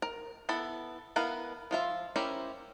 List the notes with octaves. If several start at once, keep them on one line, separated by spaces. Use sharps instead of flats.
A#4
B3 E4 A4 B5
B3 E4 A#4 B4 F5
F3 F4 E5
C#4 E4 G4 A#4 C5